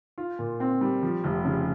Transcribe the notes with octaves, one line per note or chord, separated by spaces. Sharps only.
F4
A#2
C4
G3
F3
F1
C#3